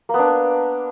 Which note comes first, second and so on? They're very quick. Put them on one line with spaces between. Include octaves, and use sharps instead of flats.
A#3 B3 D4